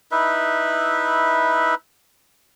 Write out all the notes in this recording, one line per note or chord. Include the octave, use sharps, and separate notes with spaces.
D#4 E4 B4 E5